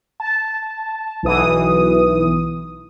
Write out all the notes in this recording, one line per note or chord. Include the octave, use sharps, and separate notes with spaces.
A5
B1 E3 D#6